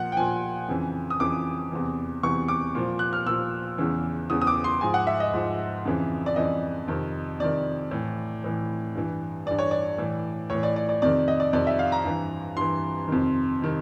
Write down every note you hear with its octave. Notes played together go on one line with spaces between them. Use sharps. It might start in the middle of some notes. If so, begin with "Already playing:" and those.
Already playing: A#2 F3 F#5
G5
A#2 F3 G#5
F2 C#3 E3
D#6
F2 C#3 E3 D6
E2 C3 E3
E2 C3 E3 C#6
D6
A#2 F3
F#6
F6
A#2 F3 E6
E2 C#3 E3
E2 C#3 E3 D#6
D#6
D6
C6
G#2 F3 G#5
F#5
E5
D#5
G#2 F3
F2 C#3 E3
D5
F2 C#3 E3 D#5
F2 C3 D#3
F2 C3 D#3 D5
A2 E3
A2 E3
G2 E3
G2 E3 D5
C#5
D5
A2 E3
A2 E3 C#5
D5
D5
D5
F2 C3 D#3 D5
D#5
D5
F2 C3 D#3 D5
E5
F5
A#5
G2 E3
G2 E3 C6
F2 C3 D#3
C3 D#3